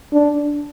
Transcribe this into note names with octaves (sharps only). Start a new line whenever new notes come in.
D4